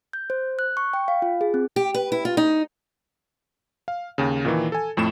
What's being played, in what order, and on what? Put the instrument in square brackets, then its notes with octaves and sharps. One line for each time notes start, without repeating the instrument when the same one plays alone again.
[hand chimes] G6
C5
F#6
C#6
G5
F5
F4
G#4
C4
[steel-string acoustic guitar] G4
B4
E4
F4
D#4
[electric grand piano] F5
D#2 C#3
A#2 D#3 E3
A4 G#5
F2 A2 A3 E7